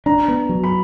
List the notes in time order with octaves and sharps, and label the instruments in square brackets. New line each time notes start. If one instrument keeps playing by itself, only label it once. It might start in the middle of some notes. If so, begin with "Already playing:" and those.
[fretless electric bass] D4 [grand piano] A#5
[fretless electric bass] B3
F#3
[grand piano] B5